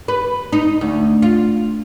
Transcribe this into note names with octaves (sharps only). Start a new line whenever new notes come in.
B4
D#4
D2
F4